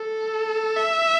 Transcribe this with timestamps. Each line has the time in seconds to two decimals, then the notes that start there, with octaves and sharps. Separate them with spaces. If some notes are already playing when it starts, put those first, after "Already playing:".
Already playing: A4
0.76 E5